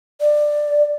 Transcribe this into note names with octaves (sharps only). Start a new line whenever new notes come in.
D5